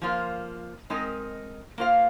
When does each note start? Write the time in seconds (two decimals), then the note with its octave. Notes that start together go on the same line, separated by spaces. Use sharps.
0.02 F3 A#3 F4 C5
0.90 G#3 C4 D#4 A#4 D#5
1.78 A#3 F4 C5 F5